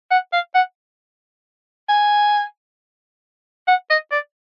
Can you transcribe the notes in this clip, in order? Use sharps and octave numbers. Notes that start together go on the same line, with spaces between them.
F#5
F5
F#5
G#5
F#5
D#5
D5